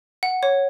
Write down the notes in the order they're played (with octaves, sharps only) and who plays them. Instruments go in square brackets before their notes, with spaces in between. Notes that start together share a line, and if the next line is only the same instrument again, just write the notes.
[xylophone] F#5
C#5